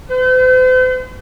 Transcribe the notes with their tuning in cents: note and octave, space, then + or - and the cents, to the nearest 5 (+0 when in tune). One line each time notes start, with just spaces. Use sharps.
C5 -45